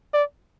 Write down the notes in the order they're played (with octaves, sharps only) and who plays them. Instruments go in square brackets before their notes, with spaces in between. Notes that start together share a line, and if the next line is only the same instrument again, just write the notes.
[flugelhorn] D5